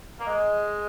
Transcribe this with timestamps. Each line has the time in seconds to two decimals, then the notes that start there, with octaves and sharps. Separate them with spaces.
0.20 A#3
0.27 G#3